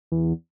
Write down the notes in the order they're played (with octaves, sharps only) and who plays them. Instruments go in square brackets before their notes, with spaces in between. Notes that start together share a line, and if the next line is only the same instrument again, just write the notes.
[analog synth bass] E2